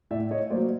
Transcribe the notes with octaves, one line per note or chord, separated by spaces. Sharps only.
A2 D5 E5
C#5 D#5
F#3 A#3 C5 D5